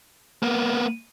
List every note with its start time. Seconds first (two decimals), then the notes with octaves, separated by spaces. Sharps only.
0.43 A#3 B3